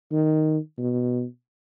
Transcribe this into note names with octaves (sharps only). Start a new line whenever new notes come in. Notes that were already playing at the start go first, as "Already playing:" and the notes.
D#3
B2